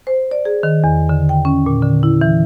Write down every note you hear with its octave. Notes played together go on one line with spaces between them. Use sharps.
C5
D5
G#4
D#3
E2
D3
G5
C#4
A#2
D3
E4
E3